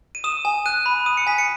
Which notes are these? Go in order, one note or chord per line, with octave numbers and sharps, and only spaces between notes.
D#7
D#6 E7
G#5
F#6 D#7
B5
D#6 D#7
C#7
G#5 B6
C#7